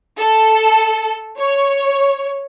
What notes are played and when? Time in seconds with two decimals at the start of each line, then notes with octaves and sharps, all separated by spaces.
0.18 A4
1.38 C#5